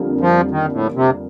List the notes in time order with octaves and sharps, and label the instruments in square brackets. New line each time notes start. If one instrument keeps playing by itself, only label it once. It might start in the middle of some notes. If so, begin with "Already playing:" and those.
Already playing: [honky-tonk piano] F2 D3 G3 A#3
[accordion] F3
D#3
A2
C3